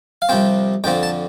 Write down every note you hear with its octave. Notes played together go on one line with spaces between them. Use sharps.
F5
C2 C3 F3 C4 G5
F2 D3 F3 C4 G5
A5